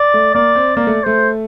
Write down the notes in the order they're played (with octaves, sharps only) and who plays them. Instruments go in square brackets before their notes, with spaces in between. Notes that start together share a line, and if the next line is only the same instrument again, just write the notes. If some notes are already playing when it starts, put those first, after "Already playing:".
Already playing: [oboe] D5
[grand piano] A3
[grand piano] A#3 [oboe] D5
[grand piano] C4
[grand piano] A#3 [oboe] D5
[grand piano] A3
[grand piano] A3 [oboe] C5